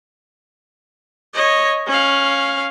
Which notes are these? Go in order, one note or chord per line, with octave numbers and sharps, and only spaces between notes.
C#5 D#5
C#4 F5